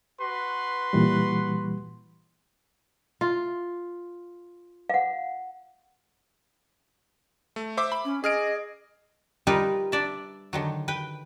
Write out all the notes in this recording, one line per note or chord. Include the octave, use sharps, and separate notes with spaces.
F#4 B4 C6
A#2 E3 G3
F4
F5 F#5
A3
C5 E5 D6
B5
C#4
G#4 D#5 F6 D7
F3 G3 D#4 F4 A#4 B4
D4 D5 E5
D3 D#3 F#3
B4 G5